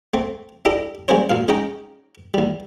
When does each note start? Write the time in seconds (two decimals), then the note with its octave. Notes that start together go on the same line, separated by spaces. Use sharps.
0.14 A3 C4
0.65 D4 E4 G4 A4 D#5
1.08 G3 G#3 A#3 C#4 C5 C#5
1.30 D2 A#2 F5
1.48 G#3 C#4 D#4 D#5 G5
2.34 D#2 G3